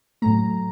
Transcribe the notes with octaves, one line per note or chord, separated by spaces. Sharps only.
A2 F#3 A3 A#5